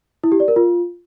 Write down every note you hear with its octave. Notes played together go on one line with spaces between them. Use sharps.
E4
G4
D5
A#4
F4